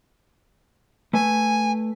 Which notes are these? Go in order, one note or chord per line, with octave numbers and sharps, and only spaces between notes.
A3 B4 G#5